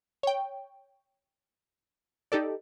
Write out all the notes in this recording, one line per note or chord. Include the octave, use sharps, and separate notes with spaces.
C#5 G5
D#4 G4 A4 D5